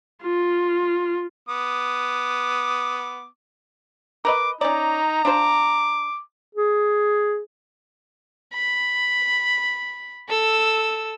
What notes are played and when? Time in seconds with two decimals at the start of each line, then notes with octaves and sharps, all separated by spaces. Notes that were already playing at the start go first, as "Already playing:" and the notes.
0.23 F4
1.49 B3 D6 D#6
4.25 A#4 B4 D#5 D6
4.61 C#4 D#4 D5 A#5
5.25 D4 F4 C5 D6
6.55 G#4
8.54 B5
10.29 A4 E6